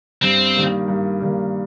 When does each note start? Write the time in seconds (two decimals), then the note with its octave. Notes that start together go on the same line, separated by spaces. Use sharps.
0.22 G2 C4
0.55 D#3 G3 A#3
0.88 G2
1.21 D#3 G3 A#3